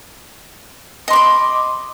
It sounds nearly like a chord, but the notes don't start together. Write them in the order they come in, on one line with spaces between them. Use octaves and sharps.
D#5 C6 D6 B5